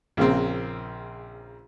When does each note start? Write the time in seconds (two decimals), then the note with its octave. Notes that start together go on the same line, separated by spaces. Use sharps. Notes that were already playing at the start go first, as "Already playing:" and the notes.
0.17 A#1 C#3 A#3 C4